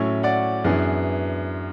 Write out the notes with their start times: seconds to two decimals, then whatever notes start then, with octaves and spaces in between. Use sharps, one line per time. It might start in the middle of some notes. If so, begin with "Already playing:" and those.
Already playing: A2 F#3 C#4 E4 C#5 E5
0.23 D5 F#5
0.64 F#2 E3 B3 D4 G#4